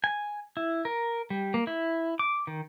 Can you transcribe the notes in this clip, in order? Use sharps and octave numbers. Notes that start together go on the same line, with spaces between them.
G#5
E4
A#4
G3
A#3
E4
D6
D#3